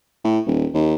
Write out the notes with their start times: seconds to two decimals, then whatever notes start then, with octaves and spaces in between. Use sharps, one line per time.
0.24 A2
0.46 D#1
0.74 D#2